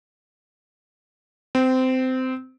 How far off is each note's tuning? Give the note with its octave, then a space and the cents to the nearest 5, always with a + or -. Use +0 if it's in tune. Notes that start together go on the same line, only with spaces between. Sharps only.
C4 -20